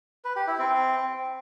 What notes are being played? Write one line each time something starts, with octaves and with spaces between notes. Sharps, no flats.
B4
G4
E4
C4